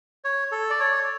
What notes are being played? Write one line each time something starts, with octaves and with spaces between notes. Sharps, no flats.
C#5
A4
D5
C#5